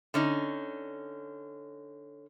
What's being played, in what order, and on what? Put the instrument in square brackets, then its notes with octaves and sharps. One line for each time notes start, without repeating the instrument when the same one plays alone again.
[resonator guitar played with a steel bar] D3 C#4 D#4